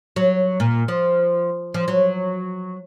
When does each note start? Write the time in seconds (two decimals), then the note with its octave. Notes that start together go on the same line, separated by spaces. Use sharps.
0.16 F#3
0.60 A#2
0.88 F3
1.74 F3
1.88 F#3